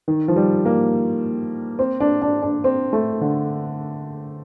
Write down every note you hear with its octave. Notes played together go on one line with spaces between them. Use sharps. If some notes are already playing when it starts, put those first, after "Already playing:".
D#3
F3
G3
A#3
C4
D4
D4
D4
C4
A3
D3